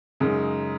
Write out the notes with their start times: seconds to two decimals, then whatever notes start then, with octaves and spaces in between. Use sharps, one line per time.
0.20 F#2 C#3 G#3 D#4